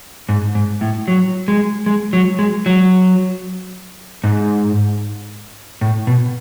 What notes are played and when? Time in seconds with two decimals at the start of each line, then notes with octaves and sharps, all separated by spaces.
0.29 G#2
0.55 G#2
0.81 A2
1.08 F#3
1.48 G#3
1.86 G#3
2.13 F#3
2.39 G#3
2.66 F#3
4.24 G#2
5.81 A2
6.07 B2